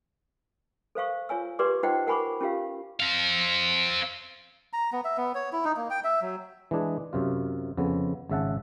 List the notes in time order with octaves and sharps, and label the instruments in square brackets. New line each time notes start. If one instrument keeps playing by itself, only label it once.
[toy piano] A4 C5 F5 C#6
F4 C#5 G#5 E6
G4 B4 D5 C6 D6
D#4 F4 C5 D#5 F#5 G5
A#4 F#5 G#5 B5 C#6 D6
C#4 F4 G4 F5
[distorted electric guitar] C4 F5
[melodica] A#5
B3
E5
B3
C#5
E4
D#4
A#3
G5
E5
F#3
[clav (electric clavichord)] E3 G#3 D4 G#4
F#2 C3 F4
F2 C#3 B3
G#1 C#3 E5 F#5 A5